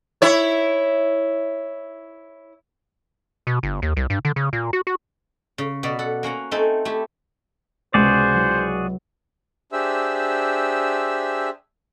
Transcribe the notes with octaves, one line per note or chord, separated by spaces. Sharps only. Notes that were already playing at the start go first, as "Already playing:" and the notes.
E4 C#5
B2
G1
D#2
C2
G2
D3
C#3
A#2
F#4
F#4
C#3
B2 B3 D5
A4 F#5
A#3 C#4 F#5 A#5
A3 C4 D#4 A4 G#5
A3 E4 G4
C#2 C3 B3 F#4 G#4 C5 D5
F#3 E4
D4 G4 G#4 C5 E5 E6